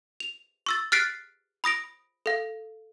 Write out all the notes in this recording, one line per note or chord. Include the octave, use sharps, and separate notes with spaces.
F7
C#6 E6 A6
F6 F#6 A6 B6 C7 D7
B5 D#6 A#6 D7
A4 F5